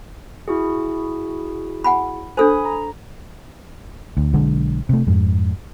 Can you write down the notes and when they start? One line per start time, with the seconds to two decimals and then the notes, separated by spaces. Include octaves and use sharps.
0.48 E4 F#4 G#4
1.84 F#5 G#5 B5
2.37 D4 A4 C5 G#5 B5 D#6
2.65 A#5
4.17 D2
4.33 B1 D3 G#3
4.89 C3 A3
5.07 F2 G#2